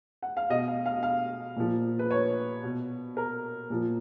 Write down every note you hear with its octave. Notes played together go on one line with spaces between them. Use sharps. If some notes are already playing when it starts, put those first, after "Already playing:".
F#5
F5
B2 D#5
F5
F5
F5
A#2 F3
B4
C#5
B2
A#4
A#2 F3